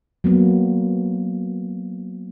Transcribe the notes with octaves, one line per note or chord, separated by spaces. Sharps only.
F#3 A#3 B3